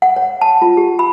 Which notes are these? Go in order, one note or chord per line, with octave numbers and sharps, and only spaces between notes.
F#5
C#5
A5
F4
G4
B5